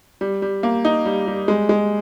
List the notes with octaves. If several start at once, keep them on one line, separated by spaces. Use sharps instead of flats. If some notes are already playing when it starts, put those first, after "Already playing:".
G3
G3
A#3
D#4
G3
G3
G#3
G#3